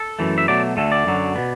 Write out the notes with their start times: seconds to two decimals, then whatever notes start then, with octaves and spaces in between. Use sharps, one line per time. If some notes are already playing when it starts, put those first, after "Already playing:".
Already playing: A4
0.19 F#2 E3 A3
0.38 E5
0.48 B2 F#3 A3 D5
0.77 D2 D3 A3 A4
0.92 D5
1.06 F#2 D3 F#3
1.35 B2 B3